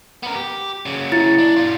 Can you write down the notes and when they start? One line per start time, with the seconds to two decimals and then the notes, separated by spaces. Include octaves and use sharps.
0.23 B3 A#4
0.35 G4
0.86 C#3 F#3
1.12 E4
1.39 D4
1.57 B2 F4